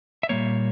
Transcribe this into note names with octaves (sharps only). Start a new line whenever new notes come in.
E5
A#2 G3 A#3 C#5